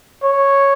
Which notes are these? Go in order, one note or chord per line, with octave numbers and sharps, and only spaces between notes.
C#5